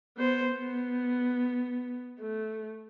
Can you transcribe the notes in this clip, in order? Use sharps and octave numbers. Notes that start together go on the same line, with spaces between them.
B3 C5
B3
A3